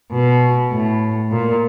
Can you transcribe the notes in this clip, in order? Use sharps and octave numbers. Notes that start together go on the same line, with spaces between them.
B2
A2
A#2